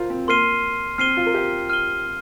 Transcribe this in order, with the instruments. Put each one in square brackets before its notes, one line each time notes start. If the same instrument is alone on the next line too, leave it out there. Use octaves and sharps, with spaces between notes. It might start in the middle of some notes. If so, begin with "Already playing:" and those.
Already playing: [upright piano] F4 A#4 C5
C4
[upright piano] A#3 [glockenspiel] C6 F6 C7 D#7 G7
[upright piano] C4 [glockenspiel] F6 C7 D#7 G7
[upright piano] F4
A#4
G4
[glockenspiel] F6 D#7 G7